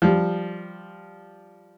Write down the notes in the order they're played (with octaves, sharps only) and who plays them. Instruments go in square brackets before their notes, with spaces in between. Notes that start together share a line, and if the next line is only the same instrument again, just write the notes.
[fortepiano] F3 G3